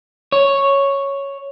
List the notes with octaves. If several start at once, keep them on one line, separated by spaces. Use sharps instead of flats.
C#5